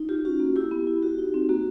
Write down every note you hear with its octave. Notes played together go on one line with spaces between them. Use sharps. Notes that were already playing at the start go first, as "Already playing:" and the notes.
Already playing: D#4
F4 G4
C#4 F#4
A#3
E4 G4
B3
E4
F#4
D#4
C4
A#3 F#4